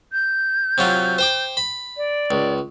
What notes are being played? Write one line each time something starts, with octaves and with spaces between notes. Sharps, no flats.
G6
C3 F#3 F4
C5 G5 D6
B5
D5
C#2